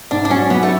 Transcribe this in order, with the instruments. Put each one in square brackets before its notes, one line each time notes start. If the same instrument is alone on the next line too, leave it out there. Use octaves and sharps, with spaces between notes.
[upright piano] G#2 [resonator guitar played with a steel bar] D4
[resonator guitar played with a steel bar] D4
[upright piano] F#3 [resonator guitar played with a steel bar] C#4
[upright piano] F#3 [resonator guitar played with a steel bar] B3
[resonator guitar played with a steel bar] A3